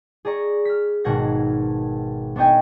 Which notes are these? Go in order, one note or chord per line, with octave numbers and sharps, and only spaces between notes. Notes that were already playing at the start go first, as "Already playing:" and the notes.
G#4 D5 A#5 C#6
F6 B6
G#1 B2 A#4 F#5 G#6 A#6
B3 D4 C#5 D#5 G5 G#5